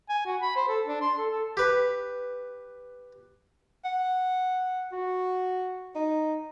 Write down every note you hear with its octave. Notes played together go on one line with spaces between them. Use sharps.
G#5
F#4
B5
C5
A4
D4
C6
A4
A4
G4 B4
F#5
F#4
D#4